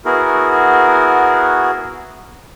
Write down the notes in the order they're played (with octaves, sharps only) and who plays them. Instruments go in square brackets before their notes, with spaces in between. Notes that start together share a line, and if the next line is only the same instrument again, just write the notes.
[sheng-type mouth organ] B3 E4 F#4 G#4 A#4